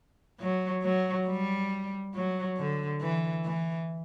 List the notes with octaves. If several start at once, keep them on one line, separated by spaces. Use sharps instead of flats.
F#3
F#3
G3
F#3
D3
E3
E3